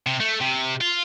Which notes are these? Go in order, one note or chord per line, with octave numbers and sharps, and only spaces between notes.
C3
A3
C3
F4